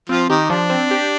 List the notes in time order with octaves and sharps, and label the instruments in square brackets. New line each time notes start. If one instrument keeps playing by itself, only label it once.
[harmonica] F3 F4 [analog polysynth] C4
[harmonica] D#3 D#4 [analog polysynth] G4
[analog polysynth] F3 [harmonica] D4
[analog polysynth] C4
G4